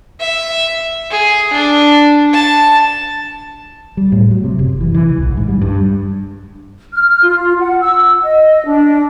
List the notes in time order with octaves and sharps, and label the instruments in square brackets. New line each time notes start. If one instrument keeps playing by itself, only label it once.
[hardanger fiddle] E5
G#4
D4
A5
[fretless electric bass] G3
A2
F#3
C3
F#1
E3
E3
C#2
A#1
G#2
G3
G2
[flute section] F6
F4
F#5
E6
D#5
D4